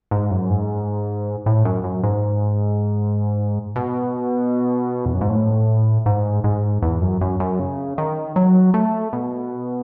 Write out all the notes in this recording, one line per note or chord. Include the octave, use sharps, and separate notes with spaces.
G#2
F#2
G#2
A2
F#2
F#2
G#2
B2
E2
F#2
G#2
A2
G#2
G#2
E2
F#2
F#2
F#2
C#3
D#3
F#3
A3
B2